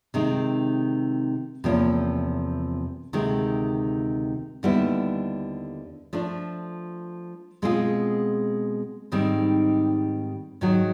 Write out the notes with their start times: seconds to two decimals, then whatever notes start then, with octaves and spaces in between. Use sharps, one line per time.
0.14 C3 D#3 G#3 C4 D#4
1.64 E2 C3 F3 A#3 C#4
3.13 D2 C3 D#3 G#3
4.63 D#2 D3 G3 B3 E4
6.13 F3 A3 D4
7.62 B2 G#3 C4 F4 G#4
9.12 G#2 D#3 G3 C4
10.61 G#2 D#3 F#3